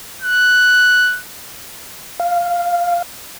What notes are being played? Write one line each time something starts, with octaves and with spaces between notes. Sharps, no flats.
F#6
F5